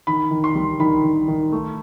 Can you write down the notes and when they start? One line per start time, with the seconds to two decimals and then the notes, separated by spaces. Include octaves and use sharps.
0.07 D#3 B5
0.31 D#3
0.44 C6
0.56 G3
0.80 D#3 B5
1.04 D#3
1.28 D#3
1.52 A3